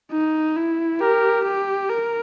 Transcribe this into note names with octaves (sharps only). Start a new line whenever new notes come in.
D#4
E4
G4 A#4
G4
A#4